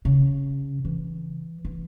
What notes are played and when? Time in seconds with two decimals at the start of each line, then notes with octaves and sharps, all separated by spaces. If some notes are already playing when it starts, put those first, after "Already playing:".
0.05 C#3
0.85 E3
1.65 E3